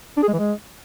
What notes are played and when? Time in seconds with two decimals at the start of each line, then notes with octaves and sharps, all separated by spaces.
0.17 D4
0.23 G#4
0.28 G#3
0.34 E3
0.39 G#3